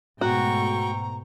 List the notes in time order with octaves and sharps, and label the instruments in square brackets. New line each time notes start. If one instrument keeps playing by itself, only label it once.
[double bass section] G#2 B2 A3 [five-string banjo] F#4 [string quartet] G5 C#6 [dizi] A#5